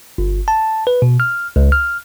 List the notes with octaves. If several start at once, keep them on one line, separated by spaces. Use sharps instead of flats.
G1
A5
B4
B2
F6
C#2
F6